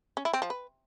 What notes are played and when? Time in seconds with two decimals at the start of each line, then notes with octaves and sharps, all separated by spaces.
0.17 C#4
0.25 E4
0.33 C4
0.42 F3
0.50 B4